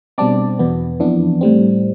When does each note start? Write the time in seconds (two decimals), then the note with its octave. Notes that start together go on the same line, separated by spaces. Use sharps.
0.18 B2 G3 C4 D4 D5
0.59 E2 B2 B3
1.00 F2 E3 B3 D4
1.41 A2 G3 C4